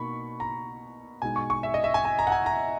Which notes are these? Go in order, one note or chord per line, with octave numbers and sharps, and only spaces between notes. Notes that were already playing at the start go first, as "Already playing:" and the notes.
Already playing: B2 A#3 D#4 B5 C#6
A#5
B2 G#3 D#4 G#5
C#6
C#6
E5
D#5
E5
G#5
G#5
A#5
F#5
G#5
A#5